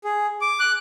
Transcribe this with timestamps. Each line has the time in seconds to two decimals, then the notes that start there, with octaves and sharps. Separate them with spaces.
0.04 G#4
0.41 D6
0.60 F#6